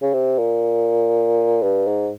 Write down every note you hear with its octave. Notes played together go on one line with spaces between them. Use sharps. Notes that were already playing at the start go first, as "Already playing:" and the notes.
C#3
C3
A#2
G2
G#2